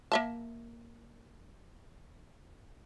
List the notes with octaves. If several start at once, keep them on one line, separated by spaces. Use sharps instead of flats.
A#3 E5 A5